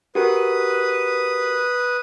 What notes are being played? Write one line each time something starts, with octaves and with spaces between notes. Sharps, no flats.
F#4 G4 A#4 B4 D#6